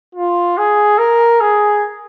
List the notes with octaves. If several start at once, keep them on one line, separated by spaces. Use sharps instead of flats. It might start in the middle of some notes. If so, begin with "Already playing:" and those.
F4
G#4
A#4
G#4